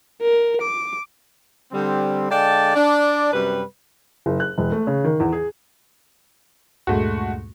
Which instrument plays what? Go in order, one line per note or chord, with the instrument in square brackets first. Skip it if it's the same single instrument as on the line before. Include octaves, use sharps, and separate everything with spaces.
[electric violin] A#4
D6
[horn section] D3 G3 C4
D3 G#3 D5 F5 G5 A5
D4 D5
F#2 C3 G3 B4
[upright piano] F#1
F#6
E1
A3
C#3
D#3
E2
G#4
[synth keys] D2 G2 A#2 [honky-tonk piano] G#3 A3 F#4